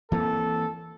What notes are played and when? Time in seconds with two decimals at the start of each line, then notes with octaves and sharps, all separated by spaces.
0.12 E3 A#3 C4 A4